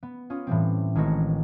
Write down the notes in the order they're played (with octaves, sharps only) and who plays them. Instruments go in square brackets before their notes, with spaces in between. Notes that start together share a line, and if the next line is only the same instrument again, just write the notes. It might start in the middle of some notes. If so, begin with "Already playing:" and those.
[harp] B3
C#4 F4 D#6
A2 E3 G3 C4
A1 D#3 G#3 C4 F#4 A#6